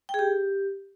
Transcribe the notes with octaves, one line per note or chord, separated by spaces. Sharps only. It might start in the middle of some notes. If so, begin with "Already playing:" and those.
G5
G#4
G4